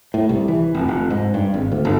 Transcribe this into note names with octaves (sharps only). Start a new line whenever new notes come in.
A2
C2
E3
F1
F1
G#2
G2
G#1
D2
G1